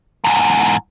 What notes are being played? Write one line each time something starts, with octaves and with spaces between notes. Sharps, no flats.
E2 G#2